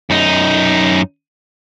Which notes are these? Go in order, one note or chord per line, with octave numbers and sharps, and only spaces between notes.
F#2 D#4